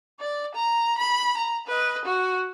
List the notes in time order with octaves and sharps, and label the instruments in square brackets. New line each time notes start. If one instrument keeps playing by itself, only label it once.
[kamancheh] D5
A#5
B5
A#5
B4 D#5
F#4